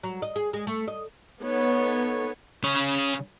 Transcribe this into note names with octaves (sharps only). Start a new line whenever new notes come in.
F#3
D#5
G#4
G#3
A3
D#5
B3 D#4 A4 C#5
C#3 C#5